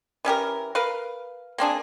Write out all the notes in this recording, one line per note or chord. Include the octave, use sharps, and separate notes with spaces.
E3 C#4 G4 A#4
A#4 B4 F5
A#3 C4 D4 G#4